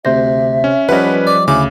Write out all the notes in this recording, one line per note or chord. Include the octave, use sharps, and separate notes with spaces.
D2 C3 C5 E5 A#6
C#4
F3 G3 C#4 B4 D#5 F#5
D5
D2 C#3 E4 G#5 B5 D6